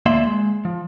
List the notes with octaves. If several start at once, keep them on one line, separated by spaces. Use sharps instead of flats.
D2 A#3 D5 E5 C6
G#3
F3